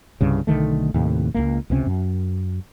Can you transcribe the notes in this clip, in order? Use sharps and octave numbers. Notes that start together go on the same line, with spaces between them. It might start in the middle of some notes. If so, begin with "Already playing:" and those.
C2 G2 C#3
B1 D3 D#3 A3
D#2 A2 C3
C#2 F#2 A#3
C#2 C3 F#3 C#4
F#2